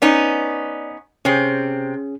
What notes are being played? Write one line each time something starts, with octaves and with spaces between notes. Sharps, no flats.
B3 C#4 D#4 D5
C3 C4 C#4 G#4